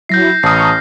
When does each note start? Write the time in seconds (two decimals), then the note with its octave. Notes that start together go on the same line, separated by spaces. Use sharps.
0.09 F#3 E4 G6 A#6 C7
0.43 A1 A5 A#5 C#6 D#6 F6 C7